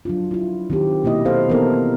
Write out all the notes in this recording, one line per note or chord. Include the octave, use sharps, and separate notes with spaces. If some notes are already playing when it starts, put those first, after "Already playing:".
F#3 D4 F4
E4 F4
D#3 C4 G4
B2 A#3 E4 F#4 D#5
C4 A4 C5 F5
E3 B3 C4 D#4 A4 A#4